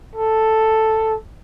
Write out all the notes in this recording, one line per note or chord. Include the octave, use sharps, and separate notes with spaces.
A4